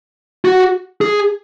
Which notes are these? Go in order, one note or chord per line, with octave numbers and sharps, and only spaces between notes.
F#4
G#4